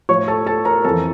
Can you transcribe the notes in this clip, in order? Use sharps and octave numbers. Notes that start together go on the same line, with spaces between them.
A2 F3 C#5 C#6
A4 A5
A4 A5
A#4 A#5
F2 E3 A4 A5